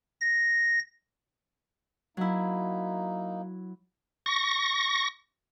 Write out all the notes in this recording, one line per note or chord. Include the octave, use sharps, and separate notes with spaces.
A#6
F#3 A#3 D#4 E4
C#6 A#6